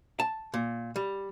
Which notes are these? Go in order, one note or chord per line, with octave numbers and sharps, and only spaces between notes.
A5
A#2
G3